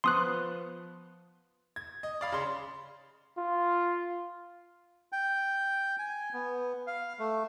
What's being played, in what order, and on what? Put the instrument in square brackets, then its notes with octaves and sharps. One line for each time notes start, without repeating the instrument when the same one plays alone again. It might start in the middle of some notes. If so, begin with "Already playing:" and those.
[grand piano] F3 B3 C#6 [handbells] C6 D#6 F#6
[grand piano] G#6
D#5
D5 F5 B5
C#3 C6
[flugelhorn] F4
[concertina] G5
G#5
B3
F5
A3